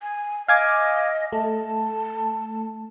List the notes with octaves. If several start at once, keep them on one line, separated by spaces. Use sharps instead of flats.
G#5
D#5 F5 G#5 D6
A3 A5